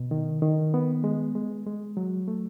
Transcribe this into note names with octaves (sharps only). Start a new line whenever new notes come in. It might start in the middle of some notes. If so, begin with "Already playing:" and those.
Already playing: B2
D#3
D#3
B3
G#3
G#3
G#3
F#3
A3